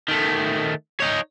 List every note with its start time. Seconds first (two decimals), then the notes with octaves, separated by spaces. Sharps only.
0.09 D#3 A3
1.00 D#4 C#5